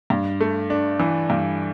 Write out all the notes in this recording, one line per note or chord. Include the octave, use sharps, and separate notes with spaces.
G2
A3
D4
E3
G2